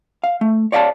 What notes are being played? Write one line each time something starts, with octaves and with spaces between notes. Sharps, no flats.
F5
A3
C#5 D5 F5 F#5 A5